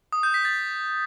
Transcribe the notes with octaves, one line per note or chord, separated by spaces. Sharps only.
D#6
G6
B6
A6